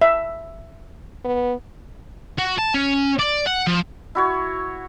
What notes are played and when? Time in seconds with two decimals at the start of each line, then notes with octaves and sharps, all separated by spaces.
0.01 E5
1.25 B3
2.39 F#4
2.59 A5
2.74 C#4
3.19 D5
3.46 F#5
3.67 F3
4.15 E4 F#4 C#5